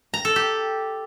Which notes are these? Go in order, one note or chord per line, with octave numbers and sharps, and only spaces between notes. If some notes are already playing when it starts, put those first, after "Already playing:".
A#5
A4
G4